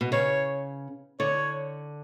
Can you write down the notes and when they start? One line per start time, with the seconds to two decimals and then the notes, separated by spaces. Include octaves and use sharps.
0.01 B2
0.12 C#3 C#5
1.19 D3 C#5